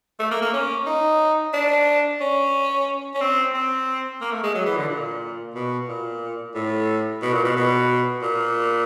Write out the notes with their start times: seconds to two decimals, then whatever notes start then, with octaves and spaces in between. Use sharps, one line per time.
0.20 A3
0.31 A#3
0.42 A#3
0.53 C#4
0.86 D#4
1.54 D4
2.20 C#4
3.14 C#4
3.21 C4
3.54 C4
4.21 A#3
4.32 A3
4.43 G#3
4.55 F#3
4.66 E3
4.77 D3
4.88 A#2
5.55 B2
5.88 A#2
6.55 A2
7.22 B2
7.33 A#2
7.45 B2
7.56 B2
8.22 A#2